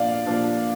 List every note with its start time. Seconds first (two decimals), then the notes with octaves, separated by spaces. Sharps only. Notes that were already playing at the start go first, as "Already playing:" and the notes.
Already playing: A#2 F3 D4 D5 F5
0.26 A#2 F3 D4